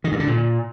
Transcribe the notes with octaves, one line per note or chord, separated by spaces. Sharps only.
D#3
G2
D3
A#2